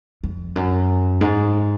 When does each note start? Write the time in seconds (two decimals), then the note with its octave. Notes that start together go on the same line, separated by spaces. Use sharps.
0.23 F2
0.56 F#2
1.21 G#2